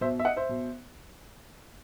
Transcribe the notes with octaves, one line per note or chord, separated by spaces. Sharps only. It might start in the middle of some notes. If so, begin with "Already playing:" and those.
B2 C5 E5
E5
D#5 F#5
C5 E5
B2